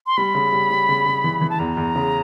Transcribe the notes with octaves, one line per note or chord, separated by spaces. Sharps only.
C6
G3 B5
C#3
G3
G3
C#3
C#3
E3
E3
A5
E2 A#5
E2
C#3